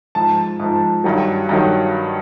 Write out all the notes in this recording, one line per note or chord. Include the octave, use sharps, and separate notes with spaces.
G#2 F3 A5
G#2 F3
G2 D#3 F#3
G2 D#3 F#3